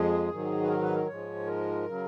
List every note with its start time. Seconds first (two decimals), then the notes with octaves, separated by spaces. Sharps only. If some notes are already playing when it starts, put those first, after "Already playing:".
Already playing: F2 F3 G#3 G#4
0.29 G#2 D#3 F#3
0.63 B4
0.68 A#4
0.82 B4
0.95 A#4
1.07 G#2 F3 G#3 C#5
1.46 A#4
1.86 C#3 F#3